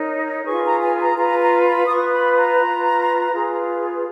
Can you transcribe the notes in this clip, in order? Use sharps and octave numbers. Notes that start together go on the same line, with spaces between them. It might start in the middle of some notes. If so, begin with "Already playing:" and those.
Already playing: D#4 A#4 C#5
F4 G#4 B4 C#6
A#5
G#5
A#5
F4 B4 A#5
A#5
B5
D#6
F4 C#6
B4
B5
A#5
F4 B4
F4 G#4 B4